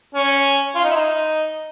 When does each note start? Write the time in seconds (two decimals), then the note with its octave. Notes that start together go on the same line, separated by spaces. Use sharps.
0.14 C#4
0.75 F4
0.84 D#4
0.90 E4
0.95 D#4